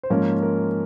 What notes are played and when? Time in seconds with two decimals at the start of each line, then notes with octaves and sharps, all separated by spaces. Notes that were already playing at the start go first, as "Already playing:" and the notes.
0.03 C5
0.10 G#2 F3 A#3 C#4 A#4
0.43 A#4